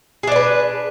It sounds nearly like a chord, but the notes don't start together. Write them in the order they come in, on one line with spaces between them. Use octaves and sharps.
G#4 D4 D5 B4